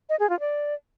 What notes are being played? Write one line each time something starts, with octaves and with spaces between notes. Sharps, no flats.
D#5
G#4
F4
D5